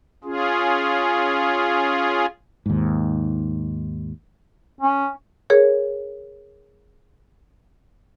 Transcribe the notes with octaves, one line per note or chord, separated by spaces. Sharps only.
C#4 F4 G#4
D#2 G#2
C#4
G#4 A#4 C#5